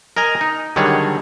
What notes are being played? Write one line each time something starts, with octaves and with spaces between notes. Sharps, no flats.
A#4 D#5 G#5 A#5
D#4
D3 D#3 F#3 G3 G#4 C#5